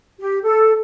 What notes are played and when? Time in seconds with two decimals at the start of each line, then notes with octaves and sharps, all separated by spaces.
0.19 G4
0.43 A4